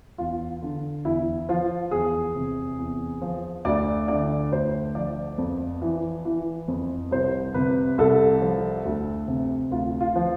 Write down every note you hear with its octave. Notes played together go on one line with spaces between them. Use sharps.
E2 F4
D3
E2 E4
F3 F4
E2 G#4
C3
E2
F3
D2 D5
D3 D5
D2 C5
F3 D5
F2
E3
E3
F2
C2 C5
C3 B4
C2 A4
F3
D2
C3
D2 F4
F4
F3